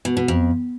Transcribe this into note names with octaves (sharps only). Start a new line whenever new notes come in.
B2
B2
F2